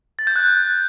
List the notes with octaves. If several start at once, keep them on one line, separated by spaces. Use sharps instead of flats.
A6
G6
F#6